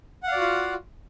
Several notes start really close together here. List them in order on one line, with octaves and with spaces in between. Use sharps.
F#5 F5 D5 F#4 F4